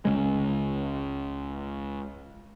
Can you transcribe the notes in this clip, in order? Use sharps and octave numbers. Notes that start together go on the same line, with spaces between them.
C#2 C#3 G#3